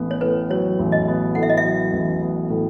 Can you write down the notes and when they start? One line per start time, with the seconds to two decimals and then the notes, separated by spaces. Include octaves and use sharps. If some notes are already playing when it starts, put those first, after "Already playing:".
Already playing: A1 B3
0.11 C#5
0.21 A2 B4
0.50 F#3 C#5
0.79 A1
0.92 D#5
1.08 B3
1.35 A2 F#5
1.43 E5
1.50 D#5
1.57 E5
1.65 F#3
1.93 A1
2.22 B3
2.50 A2